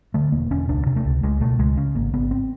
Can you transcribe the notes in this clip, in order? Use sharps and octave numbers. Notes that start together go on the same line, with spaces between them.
D3 A3
E1 A#3
E1 C#4
C#2 D4
C3
A3
C#2
C#2 G#3
B2 A3
C#2 G#3
C#3
G#1 A#3
G#1 B3
C4